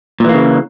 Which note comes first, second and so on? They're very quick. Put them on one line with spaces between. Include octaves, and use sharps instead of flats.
A#2 E3 A#3 C#3